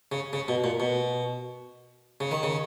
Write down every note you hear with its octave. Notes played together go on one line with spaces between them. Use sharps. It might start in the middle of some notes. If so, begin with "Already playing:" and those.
C#3
C#3
B2
A#2
B2
C#3
D#3
C#3